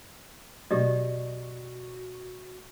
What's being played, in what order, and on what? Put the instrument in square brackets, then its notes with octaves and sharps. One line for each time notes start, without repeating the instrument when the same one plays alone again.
[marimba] B2 F#3 [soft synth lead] F#4 [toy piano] G4 D5 D#5